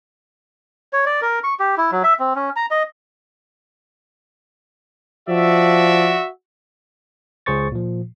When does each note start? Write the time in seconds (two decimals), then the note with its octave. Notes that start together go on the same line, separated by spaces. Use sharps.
0.93 C#5
1.06 D5
1.22 A#4
1.44 C#6
1.60 G4
1.78 E4
1.92 F#3
2.04 E5
2.20 C4
2.36 C#4
2.56 A#5
2.71 D#5
5.29 F3 F#4 D5 E5
7.46 C#2 G#4 C5 C#6 A6
7.72 A#2 F3